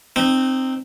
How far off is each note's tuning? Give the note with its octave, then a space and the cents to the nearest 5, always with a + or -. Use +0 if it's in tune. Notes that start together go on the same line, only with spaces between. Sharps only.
C4 +0 D#4 -25